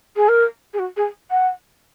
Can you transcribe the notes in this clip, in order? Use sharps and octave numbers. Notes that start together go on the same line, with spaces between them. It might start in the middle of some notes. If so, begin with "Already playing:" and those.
G#4
A#4
G#4
F#4
G#4
F#5